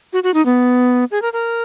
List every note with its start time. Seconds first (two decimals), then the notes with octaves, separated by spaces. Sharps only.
0.13 F#4
0.23 F#4
0.34 D#4
0.46 B3
1.11 G#4
1.22 A#4
1.33 A#4